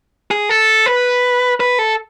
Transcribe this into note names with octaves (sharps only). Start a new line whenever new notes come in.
G#4
A4
B4
B4
A4